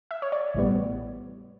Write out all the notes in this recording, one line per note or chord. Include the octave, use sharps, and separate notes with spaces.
E5
C#5
D5
A1 A2 G3 B3